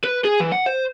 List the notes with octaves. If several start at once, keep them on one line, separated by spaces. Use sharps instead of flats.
B4
G#4
E3
F#5
C5